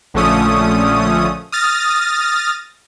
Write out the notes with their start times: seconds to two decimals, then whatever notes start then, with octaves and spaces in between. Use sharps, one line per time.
0.14 A#1 D3 F3 A3 C#4 D#6
1.52 D#6 F6 A6 A#6